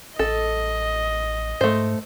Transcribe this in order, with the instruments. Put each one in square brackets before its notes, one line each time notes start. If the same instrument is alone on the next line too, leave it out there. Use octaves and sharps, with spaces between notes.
[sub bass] A1 [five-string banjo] A4 [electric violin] D#5
[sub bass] G#2 [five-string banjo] A3 C5